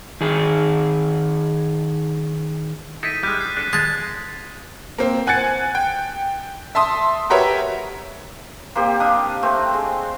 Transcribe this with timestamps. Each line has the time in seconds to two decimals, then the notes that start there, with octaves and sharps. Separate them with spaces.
0.21 D#3 G#4
3.03 D#4 E4 A4 A6 B6 D#7
3.23 G3 G#3 F#6 G6 D#7
3.41 C7
3.57 D4 A4
3.73 G#3 A5
4.98 A#3 C4
5.27 F#5 G#5 F#6 G#6 A6 C#7
5.75 G5
6.75 E5 A5 C6 D#6
7.30 F#4 G4 A#4 B4 C#5 E5
8.76 A#3 C4 G4
9.00 D4 F5 D#6
9.43 A3 C4
9.74 G#3